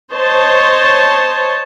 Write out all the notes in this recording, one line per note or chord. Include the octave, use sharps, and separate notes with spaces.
C5 C#5 D#5 A5